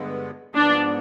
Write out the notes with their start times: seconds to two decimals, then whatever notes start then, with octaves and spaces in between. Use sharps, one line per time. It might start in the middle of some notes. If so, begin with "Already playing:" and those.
Already playing: G2 D3 G#3 B3
0.54 G#2 F3 B3 D4